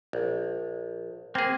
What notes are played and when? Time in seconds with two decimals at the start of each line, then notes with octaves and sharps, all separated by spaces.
0.13 A#1
1.35 A#3 C4 G#4